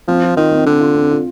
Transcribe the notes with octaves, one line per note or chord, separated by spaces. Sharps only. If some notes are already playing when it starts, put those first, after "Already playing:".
F3 C4
F4
D#3 F4
C4
D3 C4
F4
C4
F4